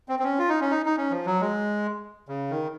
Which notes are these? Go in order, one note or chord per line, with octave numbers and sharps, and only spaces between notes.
C4
C4
C#4
F4
D#4
C#4
D#4
D#4
C#4
F3
F#3
G#3
C#3
D#3